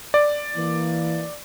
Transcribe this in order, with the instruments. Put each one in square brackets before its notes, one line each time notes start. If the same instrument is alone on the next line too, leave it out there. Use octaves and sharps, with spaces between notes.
[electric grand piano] D5
[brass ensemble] E3 A#3